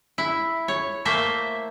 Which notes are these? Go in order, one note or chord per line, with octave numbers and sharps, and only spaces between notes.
E4
C#5
A3 A#3 C5 E5